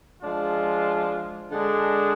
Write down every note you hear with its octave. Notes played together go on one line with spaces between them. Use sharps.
F3 G#3 D4 F4
D3 G#3 D4